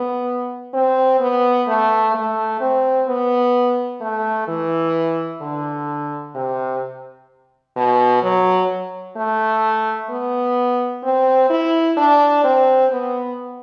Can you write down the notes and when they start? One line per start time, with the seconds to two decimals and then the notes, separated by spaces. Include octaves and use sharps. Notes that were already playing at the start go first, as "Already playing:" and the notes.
Already playing: B3
0.74 C4
1.20 B3
1.68 A3
2.14 A3
2.60 C4
3.08 B3
4.01 A3
4.48 E3
5.41 D3
6.35 C3
7.76 B2
8.23 F#3
9.16 A3
10.10 B3
11.04 C4
11.50 E4
11.97 D4
12.44 C4
12.91 B3